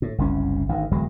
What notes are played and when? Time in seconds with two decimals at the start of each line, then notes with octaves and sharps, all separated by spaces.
0.02 A2
0.18 F#1 C2 C#4
0.69 G#1 D2 D#3
0.91 D1 E2 F#3 G#3